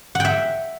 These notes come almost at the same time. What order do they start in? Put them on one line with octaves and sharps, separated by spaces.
F#5 G5 E5